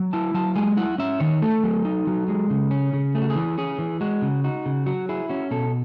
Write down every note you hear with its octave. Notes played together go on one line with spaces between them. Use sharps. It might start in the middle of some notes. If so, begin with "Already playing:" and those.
Already playing: F#3
E4 A5
F#3 A5
G#3 G#5
E4 F#5
C#4 E5
D#3 C#5
A3 A4
F#3
D#4
F#3
G#3
C#3
C#4
C#3
A3 G#4
F#4
G#4
E3
C#4 G#4
E3
G#3 F#4
C#3
D#4 F#4
C#3
F#3 F#4
E4 G#4
C#4 F#4
B2 A4